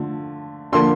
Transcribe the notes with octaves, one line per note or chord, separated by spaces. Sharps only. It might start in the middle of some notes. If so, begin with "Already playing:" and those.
Already playing: D3 F3 A3
D3 F3 A#3 C6